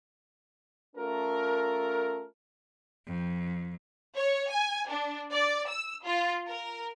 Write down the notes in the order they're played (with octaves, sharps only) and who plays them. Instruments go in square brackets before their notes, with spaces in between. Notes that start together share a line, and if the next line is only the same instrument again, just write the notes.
[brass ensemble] A3 C#4 F4 A4 A#4
[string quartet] F2
[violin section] C#5
G#5
D4
D5
E6
F4
A#4